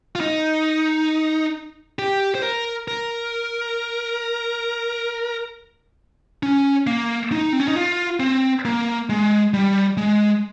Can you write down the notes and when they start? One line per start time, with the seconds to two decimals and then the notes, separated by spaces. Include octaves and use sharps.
0.15 F4
0.20 D#4
1.99 G4
2.35 C5
2.43 A#4
2.88 A#4
6.43 C#4
6.87 A#3
7.32 D#4
7.53 C4
7.60 C#4
7.68 D#4
7.76 F4
8.20 C4
8.65 A#3
9.09 G#3
9.54 G3
9.97 G#3